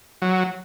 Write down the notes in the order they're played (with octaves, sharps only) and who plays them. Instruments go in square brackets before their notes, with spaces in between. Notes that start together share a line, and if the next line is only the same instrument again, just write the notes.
[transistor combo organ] F#3